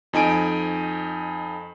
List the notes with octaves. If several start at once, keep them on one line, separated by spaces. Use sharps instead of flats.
F2 D#4 G#5 D7